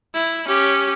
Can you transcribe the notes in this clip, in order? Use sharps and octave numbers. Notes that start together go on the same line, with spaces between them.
E4
C#4 G4